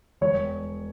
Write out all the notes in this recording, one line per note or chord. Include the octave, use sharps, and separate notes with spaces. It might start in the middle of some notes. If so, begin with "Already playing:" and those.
E1 C#5